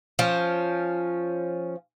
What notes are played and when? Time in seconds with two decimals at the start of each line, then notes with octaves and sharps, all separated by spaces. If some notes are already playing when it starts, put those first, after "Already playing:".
0.19 F3 C#4